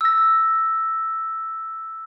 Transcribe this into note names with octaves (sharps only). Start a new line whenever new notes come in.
E6 A#6